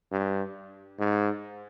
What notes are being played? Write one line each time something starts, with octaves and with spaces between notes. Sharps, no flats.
G2
G#2